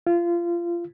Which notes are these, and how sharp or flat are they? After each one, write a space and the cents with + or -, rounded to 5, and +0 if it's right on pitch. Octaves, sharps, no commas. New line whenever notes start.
F4 -25